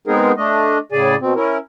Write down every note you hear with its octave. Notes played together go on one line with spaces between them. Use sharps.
G#3 B3 C4 D#4 G#4 A#4
A3 D4 D#5
A2 C#3 G#4 D5 G#5
B2 C4
C#4 E4 A#4